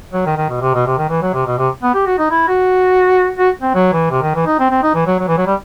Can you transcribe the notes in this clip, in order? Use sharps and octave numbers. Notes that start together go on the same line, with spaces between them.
F#3
D#3
D#3
B2
C3
B2
C3
D#3
E3
F#3
C3
B2
C3
B3
G4
F#4
D#4
E4
F#4
F#4
C4
F#3
E3
C3
D#3
E3
D#4
C4
C4
D#4
E3
F#3
F#3
E3
F#3
G3